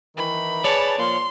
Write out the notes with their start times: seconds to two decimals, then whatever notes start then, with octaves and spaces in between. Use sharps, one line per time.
0.17 D#3 E3 B5
0.64 G#4 B4 C#5 D5 A5
0.99 A#2 F3 A#3 C6